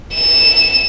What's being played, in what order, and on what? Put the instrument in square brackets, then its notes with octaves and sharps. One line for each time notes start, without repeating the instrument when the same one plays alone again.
[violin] E7